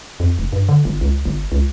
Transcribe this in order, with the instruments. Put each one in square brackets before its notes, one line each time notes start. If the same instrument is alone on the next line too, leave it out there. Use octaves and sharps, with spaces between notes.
[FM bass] F2
F1
G2
D3
G1
C#2
G1
C#2